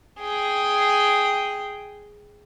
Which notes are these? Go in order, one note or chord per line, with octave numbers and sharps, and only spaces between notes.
G#4 G5